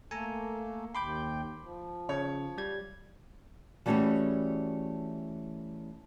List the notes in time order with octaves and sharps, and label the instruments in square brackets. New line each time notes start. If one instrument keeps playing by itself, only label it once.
[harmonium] A3 A#3 [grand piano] A4 [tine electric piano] G#5 A#5
[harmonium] D#2 G5 [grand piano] B5 [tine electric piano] C6 D6 G6
[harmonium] F3
[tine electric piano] C#3 [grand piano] C#5
[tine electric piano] G3 G#6
[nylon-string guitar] E3 G3 A3 C#4 F#4 G#4